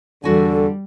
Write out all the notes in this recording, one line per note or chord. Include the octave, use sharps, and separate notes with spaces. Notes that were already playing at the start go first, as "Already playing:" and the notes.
E2 D3 G3 F#4 A4 G#5